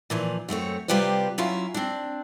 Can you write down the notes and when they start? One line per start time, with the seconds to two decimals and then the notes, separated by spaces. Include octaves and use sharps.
0.10 A#2 E3 F3
0.49 F#2 A3 C4 C#5
0.88 C3 G3 F4 G4 B4 C5
1.38 F#3 C#4 E4 F4 F5
1.74 C4 D4